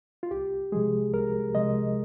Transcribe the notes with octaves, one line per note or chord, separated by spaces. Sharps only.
F4
C2 G4
C3 F3 G#3 G#4
C2 A#4
C3 F3 G#3 D#5